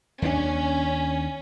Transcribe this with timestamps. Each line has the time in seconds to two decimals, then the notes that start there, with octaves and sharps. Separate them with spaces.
0.22 D#2 C#4 D4